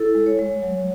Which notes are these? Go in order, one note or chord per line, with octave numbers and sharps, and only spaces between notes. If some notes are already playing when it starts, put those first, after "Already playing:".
Already playing: E4 A4
G#3
C#5
G#3
F#3